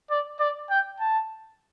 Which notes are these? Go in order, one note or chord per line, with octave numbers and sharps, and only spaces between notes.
D5
D5
G5
A5